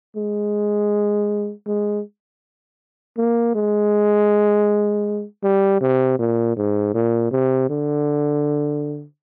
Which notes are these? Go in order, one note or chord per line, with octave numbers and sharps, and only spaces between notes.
G#3
G#3
A#3
G#3
G3
C3
A#2
G#2
A#2
C3
D3